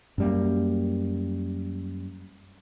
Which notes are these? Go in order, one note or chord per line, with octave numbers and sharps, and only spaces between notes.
F#2 G3 A#3